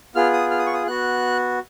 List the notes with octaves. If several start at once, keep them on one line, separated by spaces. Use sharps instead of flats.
B3 F4 G#4 F6
D#6
F6
D#6
C#6
D#6
B3 F#4 F#6